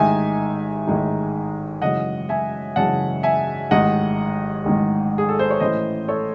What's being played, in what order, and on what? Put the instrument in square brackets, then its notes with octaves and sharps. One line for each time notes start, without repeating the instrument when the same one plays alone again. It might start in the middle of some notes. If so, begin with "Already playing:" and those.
Already playing: [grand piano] A1 G#2 D#3 G#3 D#4 E5 G#5
A1 G#2 D#3 G#3 D#4
F#2 C#3 E3 G#3 D#5 F#5
E5 G#5
F#2 C#3 E3 G#3 F#5 A5
E5 G#5
A1 G#2 D#3 G#3 D#5 F#5
A1 G#2 D#3 G#3
G#4
A4
C5
C#5
A2 E3 A3 C#4 E4 C5 D#5
A4 C#5